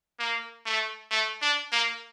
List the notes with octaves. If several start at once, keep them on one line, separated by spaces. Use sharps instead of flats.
A#3
A3
A3
D4
A#3